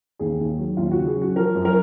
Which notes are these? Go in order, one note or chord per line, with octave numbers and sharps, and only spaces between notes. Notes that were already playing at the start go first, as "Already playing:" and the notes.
D#2 G#4
D#2
F#3
D#2 F4
F#4
C#3
G#4
F#3
F#4
F3 A#4
F#2
A#4